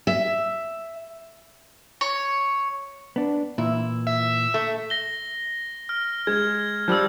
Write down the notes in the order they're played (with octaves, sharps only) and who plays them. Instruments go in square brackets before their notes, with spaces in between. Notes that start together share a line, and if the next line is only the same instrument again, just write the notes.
[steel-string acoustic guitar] E5
[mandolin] C#5
[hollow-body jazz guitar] B3 D4
[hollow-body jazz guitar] A#2 E3 [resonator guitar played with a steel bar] E4
[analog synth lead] E5
[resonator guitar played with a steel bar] A3
[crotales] A#6 G7
F6
[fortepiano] G#3 [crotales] G#6
[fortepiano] F3 G3 [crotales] E6 G6